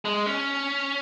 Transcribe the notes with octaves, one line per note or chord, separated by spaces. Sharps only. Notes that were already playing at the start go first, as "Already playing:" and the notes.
G#3
C#4